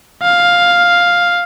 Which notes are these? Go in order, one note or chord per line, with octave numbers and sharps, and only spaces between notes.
F5